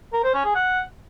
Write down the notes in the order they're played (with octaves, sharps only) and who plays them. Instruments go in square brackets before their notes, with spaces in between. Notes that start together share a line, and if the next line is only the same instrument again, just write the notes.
[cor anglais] A#4
C5
C#4
G#4
F#5